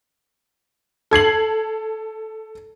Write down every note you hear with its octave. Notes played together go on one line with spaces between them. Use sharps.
A4 G#6 C7 F#7